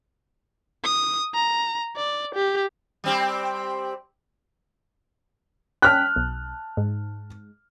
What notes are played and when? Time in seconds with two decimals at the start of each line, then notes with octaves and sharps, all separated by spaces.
0.84 D#6
1.34 A#5
1.96 D5
2.35 G4
3.04 G3 C4 G4
5.82 C#4 G5 A5 F6 F#6 B6
6.16 B1
6.77 G#2